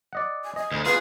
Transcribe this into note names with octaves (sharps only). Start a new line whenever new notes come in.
D5 D#5 F#5
G#5
D#5 G#5
D2
F4 G#4 B4